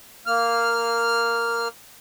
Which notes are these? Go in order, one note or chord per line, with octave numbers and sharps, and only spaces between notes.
A#3 F6